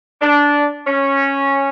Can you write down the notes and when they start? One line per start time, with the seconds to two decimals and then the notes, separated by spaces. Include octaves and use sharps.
0.22 D4
0.87 C#4